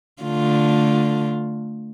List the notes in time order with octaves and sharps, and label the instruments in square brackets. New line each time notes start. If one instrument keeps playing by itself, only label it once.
[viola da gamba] D3 A3 F4